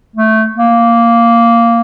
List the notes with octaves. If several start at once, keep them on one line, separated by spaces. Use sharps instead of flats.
A3
A#3